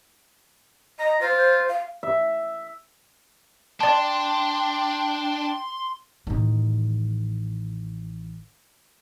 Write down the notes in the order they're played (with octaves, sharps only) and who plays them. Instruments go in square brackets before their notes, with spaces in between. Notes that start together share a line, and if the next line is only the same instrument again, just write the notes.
[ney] D#5 [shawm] A#5
[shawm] F4 [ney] C5
[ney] F5
[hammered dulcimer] E5
[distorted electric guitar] D4 [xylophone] D5 A5 [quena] G5 [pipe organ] C6
[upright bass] A1 D#3